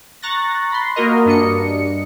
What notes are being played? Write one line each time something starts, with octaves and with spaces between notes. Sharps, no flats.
A#5 C#6 F#6 A6 A#6
B5 C6
A#3 F#4 A#4 D#5
G2 D4 D#5 C#7